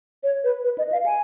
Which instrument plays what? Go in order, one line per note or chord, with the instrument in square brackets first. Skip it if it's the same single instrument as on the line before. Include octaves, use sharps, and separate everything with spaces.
[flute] C#5
B4
B4
D#5
F5
G#5